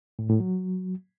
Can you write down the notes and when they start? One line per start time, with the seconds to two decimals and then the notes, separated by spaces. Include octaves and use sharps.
0.19 A2
0.29 A2
0.40 F#3